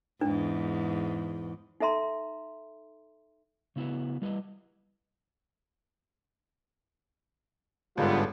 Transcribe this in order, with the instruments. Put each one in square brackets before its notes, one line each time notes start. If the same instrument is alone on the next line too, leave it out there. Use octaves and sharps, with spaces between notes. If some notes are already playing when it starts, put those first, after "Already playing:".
[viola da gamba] E2 G#2 [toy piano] D4
[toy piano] D#4 A4 E5 A#5 C6
[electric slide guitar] C#3 B3 E4 F#4 B4
G3 E4 B4 D#5
[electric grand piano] G1 G#3 A4 [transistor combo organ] G#2 D3 [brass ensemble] G3 B3 [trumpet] F4